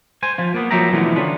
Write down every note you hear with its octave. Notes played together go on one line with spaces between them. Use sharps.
C5 G#5
F3 F4
A#3 B3
F3 F#3 A#3 E5 G5 A#5
B2 D3 E3 F3 A3 B3
D3 B3 C#4 D4 F4